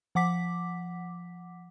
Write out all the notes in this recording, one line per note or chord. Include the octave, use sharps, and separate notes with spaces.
F3 F#5 D6 B6